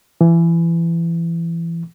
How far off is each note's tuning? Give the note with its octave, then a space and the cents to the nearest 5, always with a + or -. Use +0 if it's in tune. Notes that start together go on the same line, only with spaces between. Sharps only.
E3 +25